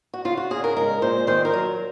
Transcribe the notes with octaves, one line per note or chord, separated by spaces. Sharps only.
F#4
C#3 F4
F#4
C#3 G#4
A#4
G#3 A#4
A#2 C5
D#3 C5
A#4
F#3